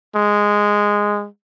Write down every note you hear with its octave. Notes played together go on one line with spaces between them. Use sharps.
G#3